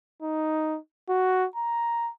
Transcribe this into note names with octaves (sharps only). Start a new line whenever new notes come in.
D#4
F#4
A#5